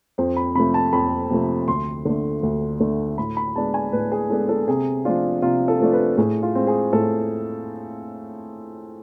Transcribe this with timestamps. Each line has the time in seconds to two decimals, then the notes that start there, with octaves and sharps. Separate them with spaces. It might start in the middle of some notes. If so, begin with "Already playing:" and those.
0.18 F2 C5
0.37 B5
0.55 C3 F3 A3 B5
0.74 A5
0.93 F2 B5
1.30 C3 F3 A3
1.68 D2 C6
2.05 D3 A3
2.43 D2
2.80 D3 A3
3.18 A2 B5
3.37 B5
3.56 G#3 B3 D4 A5
3.74 G#5
3.93 A2 B4
4.12 G#4
4.30 G#3 B3 D4 A4
4.49 A4
4.68 C3 G#4
5.05 F3 A3 D4 F4
5.42 C3 F4
5.68 A4
5.80 F3 A3 D4
5.93 B4
6.17 A2 G#4
6.43 F4
6.55 G#3 C4
6.67 G#4
6.93 A2 A4